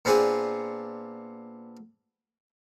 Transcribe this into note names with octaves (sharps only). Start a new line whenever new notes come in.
A#2 B3 C4 D4 G#4